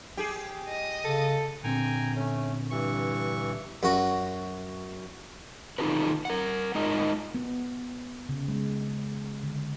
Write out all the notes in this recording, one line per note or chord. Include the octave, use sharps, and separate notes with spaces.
G4 G#4
D#5 D#6
C#3 A4
A#2 D3 C4 G5 G#5 A#5
A3 C#4
G2 E3 C#6
F#2 F#4
D#3 D#4 F4 G4 A4 B4
A#4 F#5
G#3 D#4 F4 A#4 D#5
B3
C#3
G#3
D3